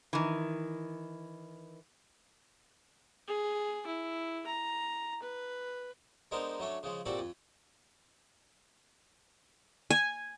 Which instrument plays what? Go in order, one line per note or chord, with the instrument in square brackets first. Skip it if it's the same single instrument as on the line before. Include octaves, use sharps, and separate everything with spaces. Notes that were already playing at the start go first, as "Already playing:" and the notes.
[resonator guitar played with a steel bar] D#3 E3
[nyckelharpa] G#4
E4
A#5
B4
[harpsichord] G#3 B3 D4 D#4 A#4 C5
F#3 A3 C#4 D4
C#3 F3 G#3
A#2 G3 C4 F#4 A4 D5
F2
[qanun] G#5